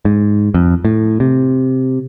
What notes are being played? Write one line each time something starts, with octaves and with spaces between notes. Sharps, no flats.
G#2
F2
A2
C3